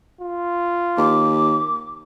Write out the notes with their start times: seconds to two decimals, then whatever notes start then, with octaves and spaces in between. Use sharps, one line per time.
0.21 F4
0.98 D#2 D6